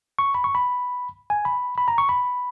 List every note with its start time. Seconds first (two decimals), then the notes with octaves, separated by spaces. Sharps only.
0.19 C#6
0.35 B5
0.44 C#6
0.55 B5
1.30 G#5
1.45 B5
1.78 B5
1.88 A#5
1.98 C#6
2.09 B5